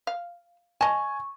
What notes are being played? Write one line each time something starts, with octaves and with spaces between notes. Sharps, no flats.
F5
D#5 G#5 A5 C#6